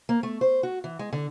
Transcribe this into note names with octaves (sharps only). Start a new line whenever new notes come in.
A#3
A3
C5
F#4
E3
G#3
D3